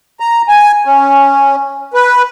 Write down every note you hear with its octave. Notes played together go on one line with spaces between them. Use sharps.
A#5
G#5
C#4
B4